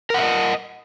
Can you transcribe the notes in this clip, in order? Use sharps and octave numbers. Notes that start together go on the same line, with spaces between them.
A#4 D#5 E5 F#5